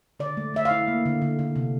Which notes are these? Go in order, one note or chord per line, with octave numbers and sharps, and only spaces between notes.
D3 D5
A3
A3 E5
F5
E4
A#3
D3
D3
D3
C3